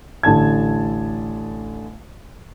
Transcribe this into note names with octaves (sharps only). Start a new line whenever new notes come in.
A1 D3 A5 G#6